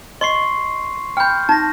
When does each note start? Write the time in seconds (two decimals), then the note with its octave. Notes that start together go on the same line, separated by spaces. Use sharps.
0.21 D#5 C6 C#6 C7
1.17 G5 B5 F6 G6
1.49 D#4 A5 A#6